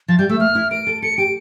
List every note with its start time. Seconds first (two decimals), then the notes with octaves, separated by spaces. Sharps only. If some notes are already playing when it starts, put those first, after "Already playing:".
0.08 F3 A6
0.19 G3 G6
0.29 A3 E6
0.40 A#3 F6
0.55 E4
0.71 A#4 D7
0.87 A4
1.02 A4 C#7
1.17 G4 D7